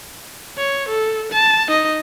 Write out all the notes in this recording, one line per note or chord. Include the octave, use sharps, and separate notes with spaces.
C#5
A4
A5
D#4 D#5